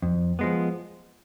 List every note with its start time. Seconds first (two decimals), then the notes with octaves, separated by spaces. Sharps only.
0.02 F2
0.39 F3 G#3 B3